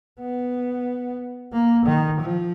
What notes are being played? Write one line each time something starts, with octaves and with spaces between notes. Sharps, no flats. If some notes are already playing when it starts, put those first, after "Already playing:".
B3
A#3
D#3
F3